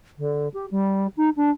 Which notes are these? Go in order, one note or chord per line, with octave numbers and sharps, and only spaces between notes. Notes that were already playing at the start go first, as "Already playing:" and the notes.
D3
G4
G3
D#4
D4